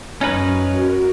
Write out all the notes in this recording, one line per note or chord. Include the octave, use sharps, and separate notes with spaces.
F#2 C#4 D#4 B4 F6
F#4 A#4